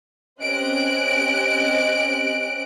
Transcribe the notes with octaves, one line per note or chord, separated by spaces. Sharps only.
C4 C#4 G4 D#5 F#6 D7